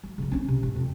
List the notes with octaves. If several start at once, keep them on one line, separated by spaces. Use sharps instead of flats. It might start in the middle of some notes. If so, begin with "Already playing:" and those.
F#3
C#3 F#3
C4 C#4
C3
A2 C3
F2